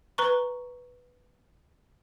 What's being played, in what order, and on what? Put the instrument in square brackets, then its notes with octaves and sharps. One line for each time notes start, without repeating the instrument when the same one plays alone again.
[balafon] B4 A#5 C#6